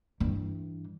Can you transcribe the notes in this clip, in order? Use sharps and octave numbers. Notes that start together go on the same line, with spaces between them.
G2 E3